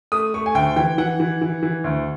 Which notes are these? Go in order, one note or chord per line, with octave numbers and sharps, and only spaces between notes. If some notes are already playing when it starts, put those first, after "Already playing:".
A3 D#6
A3 C#6
G#5
D2 G5
E3 G5
E3 F#5
E3
E3
E3
D2